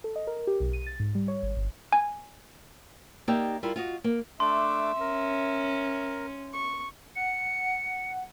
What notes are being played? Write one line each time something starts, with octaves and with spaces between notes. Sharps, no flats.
A4
D#5
A#4
G4
B1
D#7
A6
G#2
G3
C#5
G#1
G1
G#5
A#3 D#4 G4 D5 E5 G5
G3 E4 F4 A#4
F4 F#4 D#5
A#3
A3 D4 E5 C6 D6
C#4 A#4
C#6
F#5 C#7